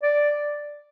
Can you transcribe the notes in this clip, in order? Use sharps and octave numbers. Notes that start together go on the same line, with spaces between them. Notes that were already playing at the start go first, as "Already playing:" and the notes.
D5